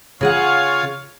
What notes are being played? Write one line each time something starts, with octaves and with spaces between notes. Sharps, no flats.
C#3 F4 G#4 C#5 F5 F#5